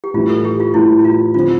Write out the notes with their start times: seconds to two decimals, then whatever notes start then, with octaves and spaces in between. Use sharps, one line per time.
0.04 G4
0.14 A2 E3 G3 F4
0.30 A4
0.45 G4
0.60 F4
0.74 A2 E3 G3 E4
1.05 F4
1.34 D3 F3 C4 F4